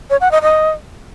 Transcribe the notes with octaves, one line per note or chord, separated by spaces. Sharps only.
C#5
F#5
D#5
D#5